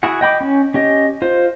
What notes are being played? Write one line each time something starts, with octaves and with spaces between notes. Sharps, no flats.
E4 F#4 G#4 F#5
D#5 G5 B5 D6
C#4
C#4 G4 D#5
F4 C5